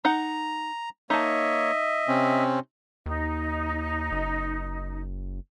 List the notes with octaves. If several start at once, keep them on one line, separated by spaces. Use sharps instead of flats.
D#4 F#5 A#5
A#3 D#4 C#5 D#5 E5 A5
C3 C4 C#4
D#2 D#4
F#1